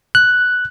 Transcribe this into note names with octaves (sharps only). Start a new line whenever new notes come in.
F#6